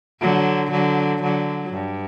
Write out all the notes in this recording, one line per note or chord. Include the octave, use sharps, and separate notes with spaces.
D3 F#3
D3 F#3
D3 F#3
G2